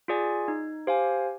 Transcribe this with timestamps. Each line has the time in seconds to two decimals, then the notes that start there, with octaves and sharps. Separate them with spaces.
0.08 F4 G#4 D5 G#5
0.48 D#4
0.87 G4 C5 F5 G#5